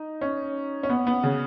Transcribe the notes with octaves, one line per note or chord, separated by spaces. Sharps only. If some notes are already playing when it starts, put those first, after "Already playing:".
Already playing: D#4
C#4
C#4
B3
B3
C#3